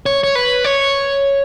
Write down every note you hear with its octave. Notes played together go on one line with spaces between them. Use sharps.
C#5
C#5
B4
C#5